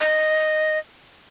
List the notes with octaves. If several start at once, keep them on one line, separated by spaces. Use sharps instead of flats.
D#5